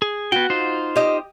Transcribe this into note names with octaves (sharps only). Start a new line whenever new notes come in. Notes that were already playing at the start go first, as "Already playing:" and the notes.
G#4
B3 F#4 G5
D#4 F4 C5
G4 D#5